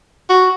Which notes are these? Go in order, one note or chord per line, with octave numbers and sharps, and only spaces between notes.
F#4